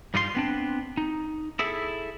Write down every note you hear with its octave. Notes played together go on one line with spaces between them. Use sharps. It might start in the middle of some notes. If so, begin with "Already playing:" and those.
G2 G3 D#4 F4 F#4 C6
B3 C4 D4
D#4
E4 G#4 A4 E5